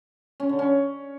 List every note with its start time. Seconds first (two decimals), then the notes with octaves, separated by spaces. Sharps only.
0.40 C#4
0.49 D3
0.59 C#4